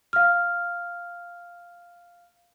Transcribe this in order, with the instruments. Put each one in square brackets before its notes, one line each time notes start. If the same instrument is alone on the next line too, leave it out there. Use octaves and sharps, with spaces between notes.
[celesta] F5 F6